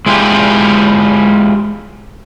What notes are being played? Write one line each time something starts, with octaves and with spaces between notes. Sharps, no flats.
G#3 E4 F4 G4